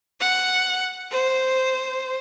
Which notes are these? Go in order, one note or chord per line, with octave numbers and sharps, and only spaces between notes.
F#5
C5